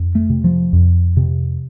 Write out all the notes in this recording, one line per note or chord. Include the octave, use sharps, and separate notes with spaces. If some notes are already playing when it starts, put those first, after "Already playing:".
Already playing: F2
A3
C3
F3
F2
C3